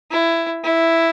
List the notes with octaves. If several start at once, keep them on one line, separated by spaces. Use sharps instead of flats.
E4
E4